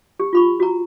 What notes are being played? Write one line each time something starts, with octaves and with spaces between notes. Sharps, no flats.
G4
F4 B5 C#6
F#4 A#5